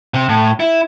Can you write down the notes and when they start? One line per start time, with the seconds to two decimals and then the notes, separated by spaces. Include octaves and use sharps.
0.14 C3
0.29 A2
0.60 E4